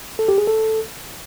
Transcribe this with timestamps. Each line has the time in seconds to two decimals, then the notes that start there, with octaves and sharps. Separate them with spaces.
0.19 A4
0.28 G4
0.38 G#4
0.47 A4